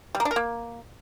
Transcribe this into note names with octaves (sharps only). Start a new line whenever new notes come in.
G3
A#3
D4
A#4
A#3